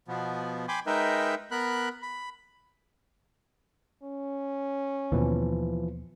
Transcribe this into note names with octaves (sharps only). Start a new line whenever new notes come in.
B2 F3 B3
G5 G#5 B5 C6 D6
G#3 D#4 A#4 B4 E5 G5
B3 A#4 B5 F#6
B5
C#4
D#2 B2 E3 F3